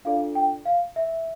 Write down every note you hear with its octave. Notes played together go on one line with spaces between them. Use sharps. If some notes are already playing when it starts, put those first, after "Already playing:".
D4 F4 A4 D5 F5
G5
F5
E5